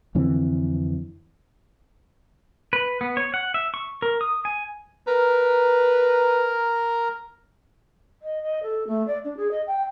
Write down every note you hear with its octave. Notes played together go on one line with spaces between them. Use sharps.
F2 D3 E3 C4
B4
B3
C#5
F#5
E5
C#6
A#4
D#6
G#5
A#4 B4 A#5
D#5
D#5
A4
A3
D5
D4
G#4
D#5
G5